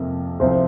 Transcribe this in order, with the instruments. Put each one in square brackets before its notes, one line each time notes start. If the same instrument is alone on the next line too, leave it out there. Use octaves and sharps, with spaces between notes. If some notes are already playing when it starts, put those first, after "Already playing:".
Already playing: [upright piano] F2 C3 F3 A#3
[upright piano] C2 C3 F3 [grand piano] C5